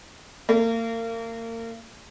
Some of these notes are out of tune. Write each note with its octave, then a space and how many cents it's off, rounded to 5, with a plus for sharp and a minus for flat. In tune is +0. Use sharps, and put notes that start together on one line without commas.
A#3 -35